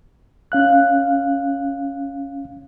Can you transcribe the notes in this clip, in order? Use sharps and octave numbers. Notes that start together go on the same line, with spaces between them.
C#4 F5 F#6